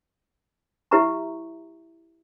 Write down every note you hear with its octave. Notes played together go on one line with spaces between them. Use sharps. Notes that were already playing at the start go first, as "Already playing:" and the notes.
E4 G4 B4 E5 A#5 C#6